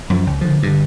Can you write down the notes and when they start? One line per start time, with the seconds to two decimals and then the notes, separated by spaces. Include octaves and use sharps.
0.10 F#2 F3
0.26 C#2
0.41 D3 F3
0.63 G2 D3